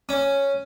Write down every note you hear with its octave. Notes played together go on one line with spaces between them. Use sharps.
C#4